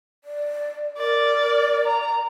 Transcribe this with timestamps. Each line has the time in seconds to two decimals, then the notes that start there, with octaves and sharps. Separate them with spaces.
0.24 D5
0.97 A#4 D5
1.86 A#5